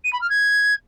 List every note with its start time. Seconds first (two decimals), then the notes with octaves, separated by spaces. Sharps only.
0.04 D#7
0.13 B5
0.21 F6
0.29 G#6